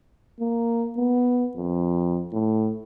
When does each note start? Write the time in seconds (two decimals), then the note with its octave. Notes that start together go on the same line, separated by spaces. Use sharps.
0.40 A#3
0.97 B3
1.56 F2
2.33 A2